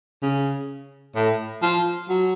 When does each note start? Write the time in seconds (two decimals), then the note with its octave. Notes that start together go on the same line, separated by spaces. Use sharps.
0.22 C#3
1.15 A2
1.62 F3
2.09 F#3